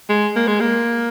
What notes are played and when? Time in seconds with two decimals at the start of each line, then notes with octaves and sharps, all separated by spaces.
0.09 G#3
0.36 A#3
0.47 G#3
0.61 A#3